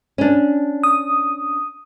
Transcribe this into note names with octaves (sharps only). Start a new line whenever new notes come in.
C#4 D4
D#6